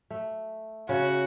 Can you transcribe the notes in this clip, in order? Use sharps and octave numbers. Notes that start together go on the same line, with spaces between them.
A3
C#3 F#4